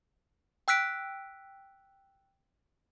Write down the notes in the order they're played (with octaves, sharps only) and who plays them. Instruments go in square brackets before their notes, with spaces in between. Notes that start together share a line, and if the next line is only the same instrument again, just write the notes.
[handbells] G5 E6 F#6 B6 D7